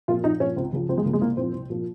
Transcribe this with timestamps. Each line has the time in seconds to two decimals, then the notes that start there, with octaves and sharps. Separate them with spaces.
0.08 A#2 F3 F4
0.24 A#1 D#4
0.40 A#2 F3 C#4
0.56 C#2 C4
0.73 C#3 F3
0.89 C#2 C4
0.97 G#3
1.04 C#3 F3 A#3
1.13 G#3
1.21 C2 A#3
1.37 A#2 F3 C4
1.53 C2
1.70 A#2 F3